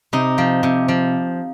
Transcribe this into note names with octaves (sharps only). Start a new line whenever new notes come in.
C3 D#4
F3
C3
F3